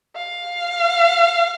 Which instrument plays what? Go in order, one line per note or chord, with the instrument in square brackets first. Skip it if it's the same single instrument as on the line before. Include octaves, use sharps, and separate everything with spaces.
[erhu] F5